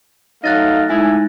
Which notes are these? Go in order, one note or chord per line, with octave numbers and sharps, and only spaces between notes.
F#3 A3 D#4 C#5 F5 F#6 A6 A#6
A2 G#3 D#4 E4 G#5